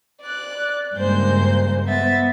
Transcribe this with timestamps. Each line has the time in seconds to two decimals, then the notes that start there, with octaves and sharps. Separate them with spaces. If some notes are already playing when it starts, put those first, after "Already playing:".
0.21 D5 F#6
0.95 G2 C#3 G#3 A#3 C5 G6
1.86 B3 E5 A6